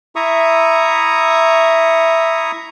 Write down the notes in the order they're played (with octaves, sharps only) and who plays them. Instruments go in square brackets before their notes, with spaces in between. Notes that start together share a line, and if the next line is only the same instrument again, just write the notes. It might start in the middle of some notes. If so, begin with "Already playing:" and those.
[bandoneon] E4 E5 A#5 C#6 D#6